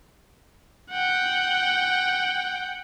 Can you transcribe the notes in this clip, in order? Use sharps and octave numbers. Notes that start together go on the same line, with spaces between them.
F#5 G5